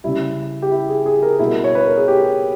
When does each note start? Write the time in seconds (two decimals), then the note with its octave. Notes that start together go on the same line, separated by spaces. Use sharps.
0.04 C#3 G3 E4
0.62 G4
0.71 E4
0.89 G#4
1.06 G#4
1.23 A#4
1.39 B2 G3 E4
1.64 C#5
1.75 B4
1.86 A#4
1.97 G#4
2.08 G4